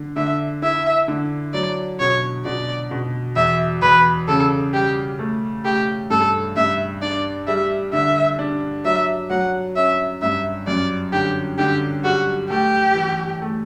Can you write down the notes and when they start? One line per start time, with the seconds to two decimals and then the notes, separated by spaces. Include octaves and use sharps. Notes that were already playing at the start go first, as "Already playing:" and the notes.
Already playing: D3
0.16 D3 E5
0.62 E4 E5
1.08 D3
1.53 F#3 D5
2.00 B2 C#5
2.45 B2 D5
2.91 B2
3.36 E2 E5
3.82 E2 B4
4.28 C#3 A4
4.74 G3 G4
5.19 A3
5.64 A3 G4
6.10 G2 A4
6.56 G2 E5
7.02 D4 D5
7.47 G3 E5
7.93 D3 E5
8.39 D4
8.85 F#3 E5
9.30 F#3 F#5
9.76 C#4 E5
10.22 G2 E5
10.67 F#2 D5
11.13 D3 G4
11.58 D3 G4
12.04 G3 F#4
12.50 A3 G4
12.95 E3
13.42 A3